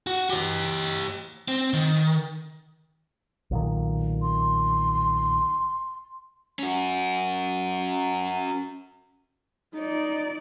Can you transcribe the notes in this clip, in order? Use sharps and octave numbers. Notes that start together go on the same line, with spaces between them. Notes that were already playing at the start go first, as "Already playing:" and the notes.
F#4
G4 C#5
C4
D#3
B1 A#2 D#3
C6
C#4 F#4
D#4 D5